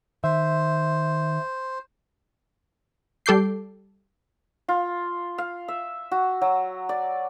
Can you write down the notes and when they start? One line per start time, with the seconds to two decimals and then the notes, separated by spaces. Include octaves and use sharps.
0.24 D#3 C5 E5
3.26 G3 A4 D6 G6 C7
4.68 F4
5.38 F5
5.68 E5
6.11 F#4
6.42 F#3
6.89 D5